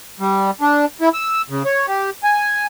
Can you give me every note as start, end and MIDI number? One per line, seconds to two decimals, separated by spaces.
0.20 0.51 55
0.61 0.85 62
1.01 1.09 64
1.14 1.42 88
1.50 1.63 49
1.65 1.86 73
1.88 2.10 67
2.24 2.67 80